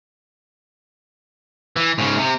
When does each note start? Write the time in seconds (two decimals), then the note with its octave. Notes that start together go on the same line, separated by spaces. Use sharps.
1.76 E3
1.98 G#2 C#3
2.17 C3